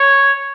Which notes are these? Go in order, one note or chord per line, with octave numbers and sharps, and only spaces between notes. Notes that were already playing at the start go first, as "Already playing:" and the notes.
Already playing: C#5